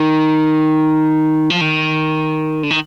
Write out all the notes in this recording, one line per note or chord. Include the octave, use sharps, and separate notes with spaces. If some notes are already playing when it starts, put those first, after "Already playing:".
Already playing: D#3
F3
D#3
D3
D#3